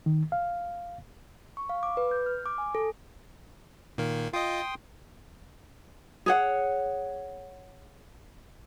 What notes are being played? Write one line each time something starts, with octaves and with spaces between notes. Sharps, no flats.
D#3
F5
C#6
F5
D6
B4
G6
F6
D6
G#5
A4
A#2 D#3 A#3
F4 D#5 G5 C6 D#6
G#4 C#5 F#5